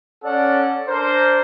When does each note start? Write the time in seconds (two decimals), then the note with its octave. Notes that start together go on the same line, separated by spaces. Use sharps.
0.23 C#4 A4 C#5 D5 F#5
0.88 D4 A#4 C5